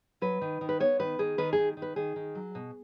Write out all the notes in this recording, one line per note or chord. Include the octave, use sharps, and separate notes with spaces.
F#3 B4
D#3
D#3
B4
B3 C#5
D#3 B4
D#3 G#4
D#3 B4
G#4
D#3
D#3
B4
D#3 G#4
D#3
F#3
B2